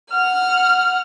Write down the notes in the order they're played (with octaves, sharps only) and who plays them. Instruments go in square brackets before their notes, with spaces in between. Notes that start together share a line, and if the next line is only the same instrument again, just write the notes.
[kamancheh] F#5 F6